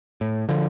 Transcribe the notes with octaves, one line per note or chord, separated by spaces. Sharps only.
A2
D3 F3